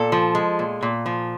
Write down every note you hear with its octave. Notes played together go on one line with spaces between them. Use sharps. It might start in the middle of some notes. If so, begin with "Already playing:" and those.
Already playing: A#2 A4
F3
G#3
A#2
A#2
F3